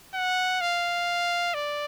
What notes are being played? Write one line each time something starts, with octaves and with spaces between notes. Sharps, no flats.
F#5
F5
D5